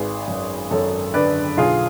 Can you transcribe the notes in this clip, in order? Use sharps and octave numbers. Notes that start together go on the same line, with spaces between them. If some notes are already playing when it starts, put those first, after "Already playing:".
Already playing: G#1 G#4 B4
F#2
F#2 A4 C#5
D3 B4 D5
B1 F4 G#4